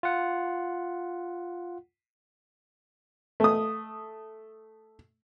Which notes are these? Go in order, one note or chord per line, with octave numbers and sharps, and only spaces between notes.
F4 F#5
A3 D#6